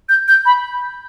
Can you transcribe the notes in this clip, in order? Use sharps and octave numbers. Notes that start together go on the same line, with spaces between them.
G6
G6
B5